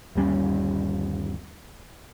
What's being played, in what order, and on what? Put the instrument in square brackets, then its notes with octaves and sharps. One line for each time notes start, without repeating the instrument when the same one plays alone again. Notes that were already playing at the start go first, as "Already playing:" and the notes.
[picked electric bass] G1 D#2 G3 C#4